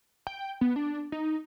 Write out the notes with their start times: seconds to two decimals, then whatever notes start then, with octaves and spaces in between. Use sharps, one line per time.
0.27 G5
0.61 B3
0.76 D4
1.12 D#4